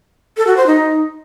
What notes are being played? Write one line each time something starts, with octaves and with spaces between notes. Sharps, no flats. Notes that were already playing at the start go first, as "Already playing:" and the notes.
A4
F#4
C5
D#4